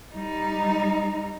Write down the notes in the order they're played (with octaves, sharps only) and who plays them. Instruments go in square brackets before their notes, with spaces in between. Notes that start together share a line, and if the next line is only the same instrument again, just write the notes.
[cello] G3 D#4